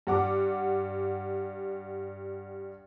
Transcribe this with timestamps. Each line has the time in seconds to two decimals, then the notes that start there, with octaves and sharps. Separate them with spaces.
0.07 G2 F#5 D6